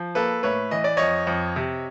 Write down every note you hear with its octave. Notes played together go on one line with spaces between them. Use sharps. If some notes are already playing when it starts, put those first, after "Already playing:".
Already playing: F3
A#3 A4 B4
A2 B4 C#5
E3 D#5
D5
F2 C#5 D#5
F2
C3